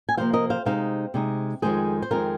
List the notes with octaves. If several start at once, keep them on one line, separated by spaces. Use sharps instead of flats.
G#5
C3 F3 A#3 C5 F5
A#4 D#5
C5 F5
C3 G#3 D#4 C5 F5
C3 G#3 D#4
F2 D#3 G#3 C4 G#4 C5
C5
F2 D#3 G#3 C4 F4 A#4